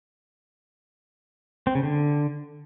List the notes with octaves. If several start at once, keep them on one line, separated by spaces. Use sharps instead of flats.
C4
C#3
D3